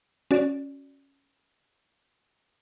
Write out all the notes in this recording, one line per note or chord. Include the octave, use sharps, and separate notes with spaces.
C#4 F#4 D5